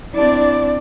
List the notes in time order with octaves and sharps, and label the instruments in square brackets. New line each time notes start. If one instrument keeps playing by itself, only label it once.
[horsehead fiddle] C4 E4 [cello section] D4 D5